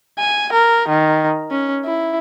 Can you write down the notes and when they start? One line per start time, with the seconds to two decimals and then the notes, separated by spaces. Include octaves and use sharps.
0.19 G#5
0.52 A#4
0.89 D#3
1.51 C#4
1.85 E4